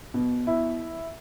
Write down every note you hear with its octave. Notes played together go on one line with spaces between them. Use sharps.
B2
E4